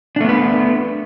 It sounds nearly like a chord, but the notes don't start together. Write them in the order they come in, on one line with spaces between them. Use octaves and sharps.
D4 A3 B3 B4